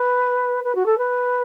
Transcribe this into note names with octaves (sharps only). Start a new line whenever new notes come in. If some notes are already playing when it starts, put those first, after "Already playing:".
Already playing: B4
B4
F#4
A4
B4